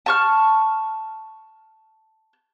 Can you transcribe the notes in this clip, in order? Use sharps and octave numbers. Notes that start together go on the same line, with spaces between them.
A5 C#6 F6